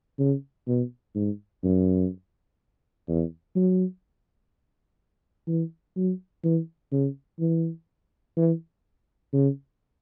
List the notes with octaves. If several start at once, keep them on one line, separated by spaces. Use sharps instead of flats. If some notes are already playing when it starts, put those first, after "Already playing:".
C#3
B2
G#2
F#2
E2
F#3
E3
F#3
E3
C#3
E3
E3
C#3